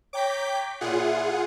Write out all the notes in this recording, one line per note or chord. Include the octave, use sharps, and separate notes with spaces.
C#5 G5 A#5 D6 G6 B6
A#2 E4 F4 G#4 F#5